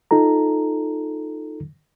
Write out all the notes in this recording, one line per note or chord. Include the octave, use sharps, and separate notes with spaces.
D#4 F4 A4 A#5